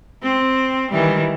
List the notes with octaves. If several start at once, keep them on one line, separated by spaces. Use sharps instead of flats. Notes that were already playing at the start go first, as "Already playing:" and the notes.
C4
D#3 E3 G3